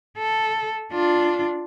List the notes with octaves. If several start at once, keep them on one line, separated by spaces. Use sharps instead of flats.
A4
D4 F4